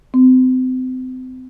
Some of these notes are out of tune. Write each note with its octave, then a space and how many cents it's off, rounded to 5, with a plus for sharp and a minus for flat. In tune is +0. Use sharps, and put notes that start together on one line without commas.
C4 -35